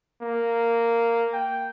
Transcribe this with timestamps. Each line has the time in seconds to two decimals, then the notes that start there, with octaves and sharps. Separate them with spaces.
0.22 A#3
1.33 G5